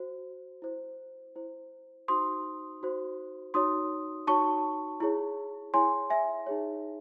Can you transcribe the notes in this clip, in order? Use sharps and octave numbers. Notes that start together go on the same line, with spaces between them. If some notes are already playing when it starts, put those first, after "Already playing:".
Already playing: F#4 C5
E4 C5
E4 C5
D#4 F#4 C5 C6 D#6
D#4 F#4 C5
D#4 F#4 C#5 C6 D#6
D#4 F#4 C#5 A5 C#6
E4 G#4 C#5
E4 G#4 C#5 G#5 C6
E5 G#5
D#4 G#4 C#5